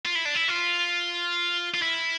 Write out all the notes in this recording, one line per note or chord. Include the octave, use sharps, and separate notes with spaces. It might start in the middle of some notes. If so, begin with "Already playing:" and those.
F4
E4
D4
E4
F4
F4
E4